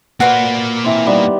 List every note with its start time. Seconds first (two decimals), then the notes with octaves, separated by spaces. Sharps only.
0.20 A#3 F#4 B4 C5 D5
0.84 E3 C4
1.06 D#3 G3 B3